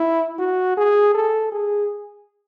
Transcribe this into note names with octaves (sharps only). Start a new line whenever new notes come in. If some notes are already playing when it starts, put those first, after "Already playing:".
Already playing: E4
F#4
G#4
A4
G#4